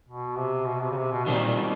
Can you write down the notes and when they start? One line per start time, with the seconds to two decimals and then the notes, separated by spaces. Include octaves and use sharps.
0.08 B2
0.37 C3
0.67 B2
0.81 C3
0.91 C#3
0.97 C3
1.12 B2
1.25 A#2 D#3 G3 C4 D#4
1.56 B2